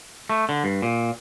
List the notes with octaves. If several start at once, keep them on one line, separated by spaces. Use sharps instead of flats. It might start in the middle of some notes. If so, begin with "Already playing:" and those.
A3
D3
G2
A#2